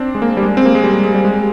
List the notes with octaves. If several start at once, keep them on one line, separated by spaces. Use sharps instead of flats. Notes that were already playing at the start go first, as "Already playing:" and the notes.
Already playing: C4 D4
G#3
A#3
G3
G#3
C4
A#3
G#3
G3
G#3
G#3
G3
G#3